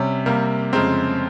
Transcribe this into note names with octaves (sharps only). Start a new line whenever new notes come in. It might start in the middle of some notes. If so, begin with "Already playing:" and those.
Already playing: C3 G3 C#4
C3 G3 A#3
F2 C#3 G#3 C4 A#5